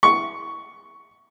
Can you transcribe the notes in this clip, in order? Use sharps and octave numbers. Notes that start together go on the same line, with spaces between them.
C#6